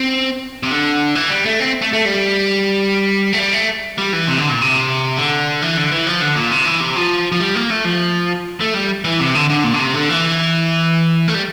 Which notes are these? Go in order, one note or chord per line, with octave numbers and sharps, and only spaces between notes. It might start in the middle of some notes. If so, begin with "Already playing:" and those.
Already playing: C4
C3
D3
E3
G3
A3
C4
A3
A3
G3
A3
G3
A3
G3
E3
C3
D3
A#2
C3
D3
E3
D3
E3
F3
D3
A#2
C3
E3
C3
F3
F3
G3
A#3
A3
F3
A3
G3
E3
C3
D3
D3
A#2
D3
C3
D3
E3
A3
G3